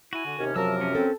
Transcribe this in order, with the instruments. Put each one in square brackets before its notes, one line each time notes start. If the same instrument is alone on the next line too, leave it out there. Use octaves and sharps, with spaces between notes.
[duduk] E4 [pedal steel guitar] F#4 G#5
[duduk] D3
[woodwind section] D#2 C#4 [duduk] C3
[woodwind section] F#2 F3 A#4 [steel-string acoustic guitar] F#3 A5 [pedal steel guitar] E6
[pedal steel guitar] C#4
[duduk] C4 [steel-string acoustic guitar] A4